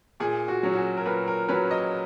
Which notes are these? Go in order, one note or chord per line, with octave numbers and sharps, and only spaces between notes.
A#2 G#4
F#4
F#3 C#4
F#4
G#4
A#4
A#2 B4
A#4
F#3 C#4 B4
D#5